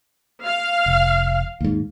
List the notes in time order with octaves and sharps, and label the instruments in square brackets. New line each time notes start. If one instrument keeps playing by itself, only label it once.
[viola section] F5
[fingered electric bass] F1
D#2 G#2